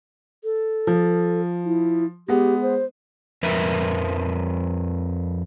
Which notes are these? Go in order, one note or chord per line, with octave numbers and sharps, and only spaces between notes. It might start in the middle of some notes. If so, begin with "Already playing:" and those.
A4
F3
E4
G#3 B3 G4
C5
F2 F3 A#4 B4 E5